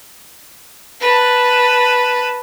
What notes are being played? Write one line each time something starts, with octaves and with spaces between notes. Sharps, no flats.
B4 A5